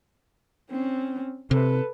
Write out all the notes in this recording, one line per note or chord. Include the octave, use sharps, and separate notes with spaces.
C4 C#4
C3 A4 B4